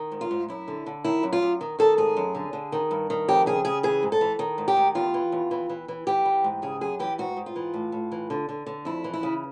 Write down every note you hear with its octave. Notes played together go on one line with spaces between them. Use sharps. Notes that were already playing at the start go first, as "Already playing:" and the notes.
Already playing: D#3
G#2
F4
G#2
F#2 E4
D3
D3
D#3 E4
F#2
F4
F#2
D#3
D#3 A4
G#2 G#4
F#2
D3
D3
D#3
G2
D#3
F2 G4
C#3 G#4
C#3 G#4
E3 G#4
G#2
A4
E3
D#3
G#2
G4
D#3
E2 F4
E3
E2
E3
E3
E3
E3 G4
E3
G#2
C#3 G#4
F#2 G#4
E3 G4
G#2 F#4
G#2
F4
E3
A2
A2
E3
D3
D3
D3
F2 E4
E3
E4
C#3